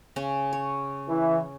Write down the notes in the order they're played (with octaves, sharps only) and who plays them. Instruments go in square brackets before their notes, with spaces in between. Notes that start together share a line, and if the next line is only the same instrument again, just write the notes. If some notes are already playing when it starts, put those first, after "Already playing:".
[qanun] C#3 C#4
C#5
[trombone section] E3